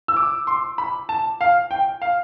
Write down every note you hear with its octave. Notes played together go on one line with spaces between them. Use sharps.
E6
D6
C6
B5
A5
F5
G5
F5